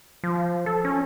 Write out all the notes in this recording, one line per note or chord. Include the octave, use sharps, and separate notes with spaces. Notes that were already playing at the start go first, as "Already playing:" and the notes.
F3
A4
C#4